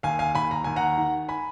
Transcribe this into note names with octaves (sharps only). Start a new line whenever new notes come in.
D#2 F5 G#5
F5 G#5
D#2 G#5 B5
A#5
D#2 G#5
F#5 A#5
D#3
G#5 B5